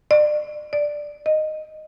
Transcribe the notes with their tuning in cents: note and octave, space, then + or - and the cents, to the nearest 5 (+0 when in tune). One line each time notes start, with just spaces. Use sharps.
D5 +35
D5 +5
D#5 -10